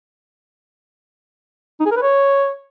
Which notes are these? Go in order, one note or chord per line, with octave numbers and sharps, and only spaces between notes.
D#4
G#4
A#4
B4
C#5